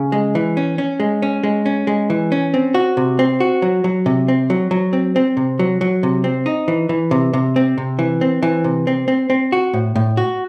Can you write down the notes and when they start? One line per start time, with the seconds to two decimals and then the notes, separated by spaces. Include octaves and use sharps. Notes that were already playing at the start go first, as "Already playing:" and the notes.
Already playing: C#3
0.12 G#3
0.35 E3
0.57 C#4
0.78 C#4
1.00 G#3
1.22 C#4
1.43 G#3
1.66 C#4
1.87 G#3
2.10 E3
2.32 C#4
2.54 C4
2.74 F#4
2.97 C3
3.19 C4
3.40 F#4
3.62 F#3
3.84 F#3
4.06 C3
4.28 C4
4.50 F#3
4.71 F#3
4.93 C4
5.16 C4
5.37 C3
5.59 F#3
5.81 F#3
6.03 C3
6.24 C4
6.46 D#4
6.68 E3
6.89 E3
7.11 C3
7.33 C3
7.56 C4
7.78 C3
7.99 E3
8.21 C4
8.43 E3
8.64 C3
8.87 C4
9.08 C4
9.30 C4
9.52 F#4
9.74 A2
9.96 A2
10.17 F#4